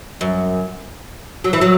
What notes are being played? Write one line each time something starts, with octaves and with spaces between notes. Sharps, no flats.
F#2
F#3
E3
F#3